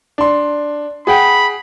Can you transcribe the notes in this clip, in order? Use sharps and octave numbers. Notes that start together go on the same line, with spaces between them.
D4 C6
G#4 F#5 G5 B5